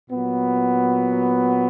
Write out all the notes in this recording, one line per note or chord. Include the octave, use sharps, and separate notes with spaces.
A#2 F#3 B3